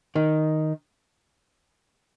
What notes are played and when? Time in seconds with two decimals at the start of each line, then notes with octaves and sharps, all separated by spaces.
0.15 D#3